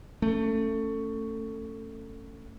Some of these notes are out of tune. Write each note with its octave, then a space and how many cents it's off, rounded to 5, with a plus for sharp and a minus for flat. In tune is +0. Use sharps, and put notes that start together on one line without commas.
A3 +20 C#4 +0